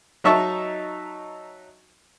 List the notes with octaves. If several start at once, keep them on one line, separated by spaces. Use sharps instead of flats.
F#3 D#4 E5 A5 C#6